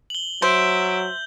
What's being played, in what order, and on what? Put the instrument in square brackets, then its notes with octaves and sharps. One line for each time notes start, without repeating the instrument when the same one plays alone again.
[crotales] F#7 G7
[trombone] F#3 [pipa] C5 [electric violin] E5 D7 [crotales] G6 F#7